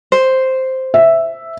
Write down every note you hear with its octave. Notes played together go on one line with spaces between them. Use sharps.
C5
E5